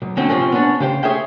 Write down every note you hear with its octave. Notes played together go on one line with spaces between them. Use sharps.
B1
D3 F#3 C4 C#4
C3 F3 C4 C#4
B3 C#4 D4
C#3 G4 C5
G#4 C#5 E5 G5